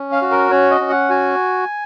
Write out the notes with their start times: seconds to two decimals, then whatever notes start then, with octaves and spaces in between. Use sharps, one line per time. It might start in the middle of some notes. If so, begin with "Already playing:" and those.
Already playing: C#4
0.12 F5
0.22 F#4
0.31 A#4
0.51 C#4 C#5
0.71 D#5
0.81 C#4
0.90 F#5
1.09 F#4 G#5